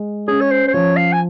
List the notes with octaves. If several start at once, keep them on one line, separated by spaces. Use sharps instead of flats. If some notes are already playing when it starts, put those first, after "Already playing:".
Already playing: G#3
C#4 G#4
C#5
C5
C5
F3 C#5
F5
G#5